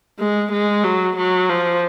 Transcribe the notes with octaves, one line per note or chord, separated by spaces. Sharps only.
G#3
G#3
F#3
F#3
F3